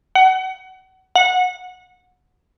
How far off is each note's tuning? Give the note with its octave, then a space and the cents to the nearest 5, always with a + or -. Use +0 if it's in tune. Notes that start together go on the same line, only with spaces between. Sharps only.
F#5 +30
F#5 -20